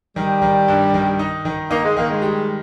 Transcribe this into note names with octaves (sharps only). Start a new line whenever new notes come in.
D#3 G3
D#3
G2
D#3
D#4
D#3
A#3 D#4
G#3
D#3 A#3
G#3
G3